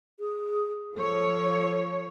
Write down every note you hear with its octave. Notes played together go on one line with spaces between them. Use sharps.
G#4
F3 A4 C#5